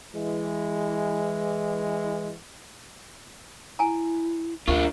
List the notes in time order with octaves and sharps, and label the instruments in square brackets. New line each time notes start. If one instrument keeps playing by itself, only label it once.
[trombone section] E3 G#3
[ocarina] E4 [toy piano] G#5 A#5
[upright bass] D2 [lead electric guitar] D4 F4 [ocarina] A#4 [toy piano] C#6